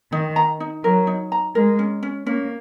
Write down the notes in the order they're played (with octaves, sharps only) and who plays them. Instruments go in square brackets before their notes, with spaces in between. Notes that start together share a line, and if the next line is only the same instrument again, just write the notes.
[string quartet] D#3 [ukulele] D#4
[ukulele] A#5
D#4
[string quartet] F#3 [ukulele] A#4
[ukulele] D#4
A#5
[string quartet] G#3 [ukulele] A#4
[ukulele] C#4
C#4
[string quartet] A#3 [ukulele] C#4